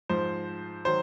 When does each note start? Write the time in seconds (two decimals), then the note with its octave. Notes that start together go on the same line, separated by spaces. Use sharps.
0.09 G#2 F3 C5
0.85 D#3 F#3 C5